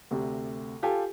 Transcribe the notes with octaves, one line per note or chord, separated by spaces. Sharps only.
D2 C3
F4 G4 A4 G#5